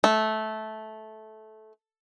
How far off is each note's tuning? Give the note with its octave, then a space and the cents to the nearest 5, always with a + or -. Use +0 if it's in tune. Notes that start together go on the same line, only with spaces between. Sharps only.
A3 -15